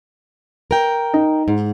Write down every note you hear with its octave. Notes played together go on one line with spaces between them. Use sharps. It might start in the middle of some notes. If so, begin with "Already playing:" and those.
A#4 G5
D#4
G#2